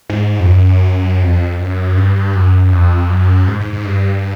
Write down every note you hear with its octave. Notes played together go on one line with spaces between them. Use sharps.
G#2
F2
F#2
F2
F#2
G2
F#2
F2
F#2
G#2
G#2
G#2
G2